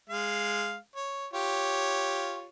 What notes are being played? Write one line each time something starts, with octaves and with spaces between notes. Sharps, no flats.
G#3 F5
C#5
F4 G4 C#5